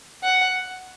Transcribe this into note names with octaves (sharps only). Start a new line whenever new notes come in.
F#5